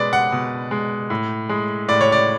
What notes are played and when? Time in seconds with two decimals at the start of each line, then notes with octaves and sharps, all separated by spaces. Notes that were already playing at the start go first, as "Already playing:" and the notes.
Already playing: B2 G#3 B4 D5
0.13 F#5
0.32 B2
0.71 G#3
1.10 A2
1.49 G#3
1.88 A2 D5
2.01 C#5
2.12 D5